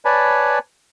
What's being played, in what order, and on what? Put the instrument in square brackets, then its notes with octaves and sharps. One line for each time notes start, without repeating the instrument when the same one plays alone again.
[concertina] B4 C#5 D5 G#5 A5 B5